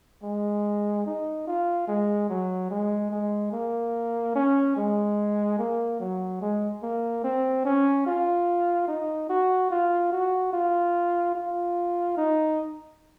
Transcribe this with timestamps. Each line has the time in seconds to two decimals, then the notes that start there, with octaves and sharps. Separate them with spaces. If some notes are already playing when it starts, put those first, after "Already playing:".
0.23 G#3
1.06 D#4
1.47 F4
1.87 G#3
2.30 F#3
2.70 G#3
3.11 G#3
3.52 A#3
4.35 C#4
4.77 G#3
5.58 A#3
6.00 F#3
6.41 G#3
6.83 A#3
7.24 C4
7.65 C#4
8.06 F4
8.88 D#4
9.29 F#4
9.71 F4
10.12 F#4
10.53 F4
11.35 F4
12.17 D#4